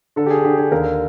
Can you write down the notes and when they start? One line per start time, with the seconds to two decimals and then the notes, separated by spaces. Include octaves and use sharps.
0.16 D3 A4
0.26 G4
0.30 G#4
0.44 D3 G4
0.58 G#4
0.72 D#2 A#4